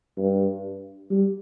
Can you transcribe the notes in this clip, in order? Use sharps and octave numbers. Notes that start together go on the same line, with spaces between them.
G2
G3